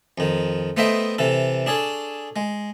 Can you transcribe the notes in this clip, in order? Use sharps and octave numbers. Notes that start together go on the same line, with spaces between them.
F2 D#3
A3 B3 C5 D#5 E5 G5
C3 E3 A4
D4 G#4 A4 C#5
G#3